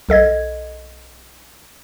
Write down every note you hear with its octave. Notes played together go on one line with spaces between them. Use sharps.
B1 A4 D#5 G#6